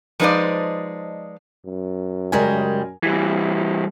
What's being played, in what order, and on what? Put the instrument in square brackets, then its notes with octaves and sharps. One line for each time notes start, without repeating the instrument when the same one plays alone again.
[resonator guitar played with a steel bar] F3 G#3 D#4 B4 C5 D5
[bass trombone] F#2
[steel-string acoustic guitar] C#3 G3 G#3 [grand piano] A#4 G#5
[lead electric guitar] E3 G3